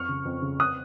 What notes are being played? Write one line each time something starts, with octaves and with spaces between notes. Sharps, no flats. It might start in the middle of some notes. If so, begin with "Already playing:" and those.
Already playing: F2 C#6 F6
C#3
F2
C#3
D#6 F#6